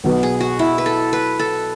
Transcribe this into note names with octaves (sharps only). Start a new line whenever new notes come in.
B1 B2 F#3 B3
G#4
F#4
E4
B4
A4
B4
A4